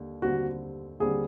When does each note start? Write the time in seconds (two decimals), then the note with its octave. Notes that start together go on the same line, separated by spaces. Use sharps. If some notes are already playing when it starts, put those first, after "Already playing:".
Already playing: D#2 D3 G3
0.22 D#2 D3 G3 C4 F#4
1.00 D#2 D3 G3 C4 G#4